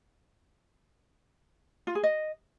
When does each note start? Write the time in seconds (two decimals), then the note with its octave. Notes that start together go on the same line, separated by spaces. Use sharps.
1.87 F4
1.95 G#4
2.03 D#5